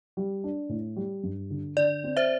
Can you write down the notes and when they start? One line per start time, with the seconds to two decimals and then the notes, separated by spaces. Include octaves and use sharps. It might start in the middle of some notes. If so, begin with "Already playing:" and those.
0.17 G3
0.44 D4
0.69 A2
0.96 G3
1.23 G2
1.50 D3
1.77 D3 D5
2.04 C4
2.17 C5 E5